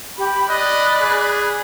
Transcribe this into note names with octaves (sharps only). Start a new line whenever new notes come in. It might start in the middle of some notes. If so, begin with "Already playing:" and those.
G4 B5
D5 D#5 B5 F#6
G#4